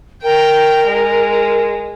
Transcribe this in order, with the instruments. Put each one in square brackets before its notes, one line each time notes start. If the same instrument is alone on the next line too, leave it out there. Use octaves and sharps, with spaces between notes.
[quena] A#4 [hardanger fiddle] G5
[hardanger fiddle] G#3